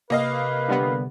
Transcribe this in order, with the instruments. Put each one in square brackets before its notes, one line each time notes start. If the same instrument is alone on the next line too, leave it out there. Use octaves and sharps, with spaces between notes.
[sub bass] C3 [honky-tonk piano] A#3 D#5 F5 [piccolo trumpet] B4
[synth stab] D3 G3 B3